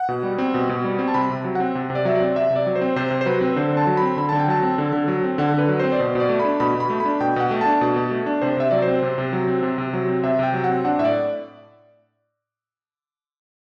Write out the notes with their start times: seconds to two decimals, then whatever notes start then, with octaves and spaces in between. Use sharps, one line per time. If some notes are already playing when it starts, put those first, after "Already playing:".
Already playing: F#5
0.09 B2
0.23 G3
0.38 C4
0.54 B2
0.69 B2
0.84 G3
0.99 C4
1.08 A5
1.14 C3 B5
1.30 C3
1.44 F#3
1.55 C4 F#5
1.75 C3
1.90 C3
1.95 D5
2.05 F#3 E5
2.15 C4 D5
2.36 C3 E5
2.50 C3
2.56 D5
2.67 F#3
2.76 C5
2.81 C4
2.96 C3 C5
3.11 C3
3.21 C5
3.26 F#3 B4
3.41 C4
3.47 B4
3.56 D3 C5
3.73 D3 A5
3.87 F#3
3.97 C4 B5
4.17 D3 B5
4.29 D3 A5
4.39 G5
4.48 F#3 A5
4.63 C4
4.78 D3
4.93 D3
5.08 F#3
5.23 C4
5.38 D3 F#5
5.54 D3 B4
5.69 F#3
5.80 C4 C5
5.92 D5
5.99 B2 C5
6.15 B2
6.20 D5
6.29 A3
6.40 B5
6.45 D4
6.60 B2 B5
6.75 B2
6.80 B5
6.90 A3
7.00 B5
7.05 D4
7.20 B2 G5
7.36 B2 F#5
7.51 A3
7.61 D4 A5
7.81 B2
7.96 B2
8.11 A3
8.26 D4
8.42 C3 C5
8.57 C3 E5
8.71 F#3 D5
8.82 C5
8.88 C4
9.03 C3
9.18 C3
9.33 F#3
9.48 C4
9.63 C3
9.78 C3
9.93 F#3
10.09 C4
10.23 C3 E5
10.39 C3 G5
10.53 F#3
10.64 F#5
10.69 C4
10.85 D4 F#5
10.99 A2 E5
11.05 D5